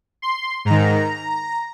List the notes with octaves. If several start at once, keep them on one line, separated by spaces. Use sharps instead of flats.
C6
G#2 D#3 A#5